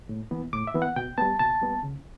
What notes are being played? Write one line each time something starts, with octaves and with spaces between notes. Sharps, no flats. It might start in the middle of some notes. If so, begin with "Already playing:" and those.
A2
E3 B3
A2 D6
E5
E3 B3
F#5
B2 G5
G3 B3 A5
B2 A5
G3 B3
C#3